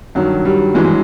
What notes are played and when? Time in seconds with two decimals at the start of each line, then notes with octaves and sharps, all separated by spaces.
0.15 G2 D#3 F#3
0.45 G3
0.74 G2 E3 F#3 G#3
0.84 G#3